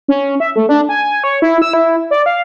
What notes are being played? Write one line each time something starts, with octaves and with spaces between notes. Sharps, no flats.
C#4
E5
A3
D4
G#5
C#5
E4
E6
E4
D5
F5